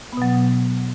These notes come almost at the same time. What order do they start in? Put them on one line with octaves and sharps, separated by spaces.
B3 B2 F#3